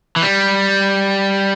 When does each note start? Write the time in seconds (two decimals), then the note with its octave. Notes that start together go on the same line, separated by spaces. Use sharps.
0.16 E3
0.22 G3